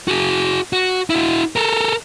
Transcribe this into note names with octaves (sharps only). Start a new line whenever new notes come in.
F#4 G#4
F#4
E4 F#4
A4 A#4